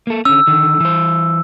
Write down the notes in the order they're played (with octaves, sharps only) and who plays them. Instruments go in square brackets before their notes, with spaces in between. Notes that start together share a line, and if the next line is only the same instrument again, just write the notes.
[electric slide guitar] A#3 A4
[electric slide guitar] D3 C#4 [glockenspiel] E6
[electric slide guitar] D3 D#3
E3 C5